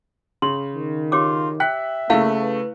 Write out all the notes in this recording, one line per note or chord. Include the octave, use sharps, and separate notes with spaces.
C#3 C6
D#3
F4 G4 C#5 D6
E5 G5 F#6 B6
C#3 A3 A#3 E4 F5 C#6
B4